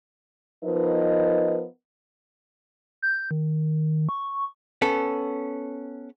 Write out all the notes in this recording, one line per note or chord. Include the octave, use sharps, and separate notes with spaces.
F3 B3 D#4 A#4 B4 D#5
G6
D#3
C#6
B3 C#4 A4